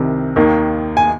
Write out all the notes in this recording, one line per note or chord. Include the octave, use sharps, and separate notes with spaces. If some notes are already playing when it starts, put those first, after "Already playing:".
Already playing: C2 C3 D#3
D#2 D#3 A#3
G#5